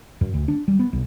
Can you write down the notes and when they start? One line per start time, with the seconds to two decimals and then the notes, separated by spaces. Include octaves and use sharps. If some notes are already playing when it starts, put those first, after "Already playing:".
0.21 F#2
0.34 D2
0.48 D4
0.68 G3
0.79 B3
0.93 B1